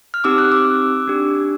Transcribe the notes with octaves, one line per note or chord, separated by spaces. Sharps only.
F6
C4 D#4 G4 D6 E6
E6 F#6
D6 E6
D4 G4